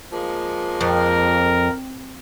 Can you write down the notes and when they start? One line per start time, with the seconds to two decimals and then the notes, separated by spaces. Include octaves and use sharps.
0.12 F3 G#3 A#3
0.81 F2 A#4